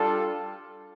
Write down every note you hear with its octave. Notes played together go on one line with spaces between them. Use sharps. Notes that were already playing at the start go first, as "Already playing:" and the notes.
Already playing: G3 D4 F4 A4